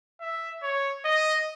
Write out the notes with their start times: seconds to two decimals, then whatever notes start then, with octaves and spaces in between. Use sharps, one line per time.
0.21 E5
0.63 C#5
1.05 D#5